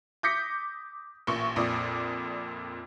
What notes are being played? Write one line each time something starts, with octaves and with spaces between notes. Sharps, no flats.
D6 D#6 G6 A#6 B6 C#7
A1 A#2 C#6
A#1 F2 A#2 D5 D#6